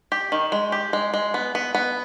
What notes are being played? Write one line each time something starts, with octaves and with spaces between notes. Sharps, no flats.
G4
D#3
G#3
G4
G#3
G#3
B3
B3
B3